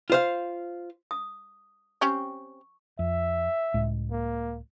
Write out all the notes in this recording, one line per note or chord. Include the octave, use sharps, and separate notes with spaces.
F4 C5 F5
D#6
C4 C#4 G4 C#6
F2 E5
C#2 A2 G#3
A#3